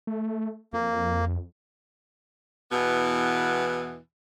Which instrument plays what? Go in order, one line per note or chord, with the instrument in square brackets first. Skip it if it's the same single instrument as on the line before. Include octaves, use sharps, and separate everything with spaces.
[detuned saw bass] A3
[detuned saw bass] F2 [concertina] A#3
[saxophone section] E2 B2 E3 B3